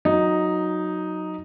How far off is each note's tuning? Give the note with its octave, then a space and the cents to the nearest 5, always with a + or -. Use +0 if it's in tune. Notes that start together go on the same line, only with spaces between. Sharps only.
F#3 -5 D#4 +0